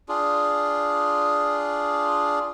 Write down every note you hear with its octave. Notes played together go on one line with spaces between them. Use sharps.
D4 F4 G#4